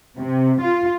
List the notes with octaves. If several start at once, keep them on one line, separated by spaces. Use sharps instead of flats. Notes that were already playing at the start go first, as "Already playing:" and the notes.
C3
F4